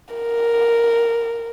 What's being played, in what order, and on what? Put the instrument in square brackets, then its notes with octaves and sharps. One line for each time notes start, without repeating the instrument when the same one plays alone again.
[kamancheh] A#4